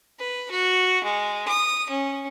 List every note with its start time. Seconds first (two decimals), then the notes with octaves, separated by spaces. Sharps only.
0.19 B4
0.51 F#4
1.04 G#3
1.48 D#6
1.90 C#4